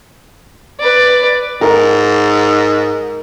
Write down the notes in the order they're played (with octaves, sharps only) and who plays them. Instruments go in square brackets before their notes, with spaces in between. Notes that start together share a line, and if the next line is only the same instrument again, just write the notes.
[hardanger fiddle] B4 D5
[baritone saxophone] G#2 [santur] A#4